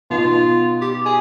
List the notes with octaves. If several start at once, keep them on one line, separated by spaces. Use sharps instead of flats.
B2 B3 D#4 F4
G4
G#4